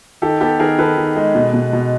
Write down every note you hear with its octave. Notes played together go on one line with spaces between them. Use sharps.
D#3 G4 A4
B3 G4 A4
D#3 G#4 A#4
D#3 A4 B4
D#3
G#3
B2
B2
B2